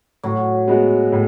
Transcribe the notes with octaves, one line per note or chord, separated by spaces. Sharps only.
A2 F#3
G#3 B3 F#4
A2